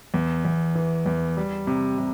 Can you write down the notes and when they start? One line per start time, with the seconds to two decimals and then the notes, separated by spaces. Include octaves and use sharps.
0.14 E2
0.45 E2
0.75 E3
1.06 E2
1.37 G3
1.67 C3
1.98 C3